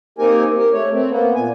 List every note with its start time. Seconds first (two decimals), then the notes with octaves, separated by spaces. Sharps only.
0.18 A#3 C4 D#4 G4 A#4 G#5
0.58 G4 A#4
0.73 A3 C#5
0.92 A3 C4
1.10 A#3 B3
1.35 A#2 G#5